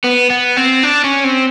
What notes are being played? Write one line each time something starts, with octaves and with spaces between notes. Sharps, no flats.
B3
B3
C4
D4
C#4
C4